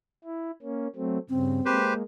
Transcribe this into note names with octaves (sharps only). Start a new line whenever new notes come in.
E4
A#3 C#4
F#3 A3 C4
G2 C#3 C4
G#3 A#3 G4 B4 C5